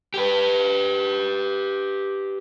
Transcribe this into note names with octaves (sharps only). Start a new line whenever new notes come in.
G4 B4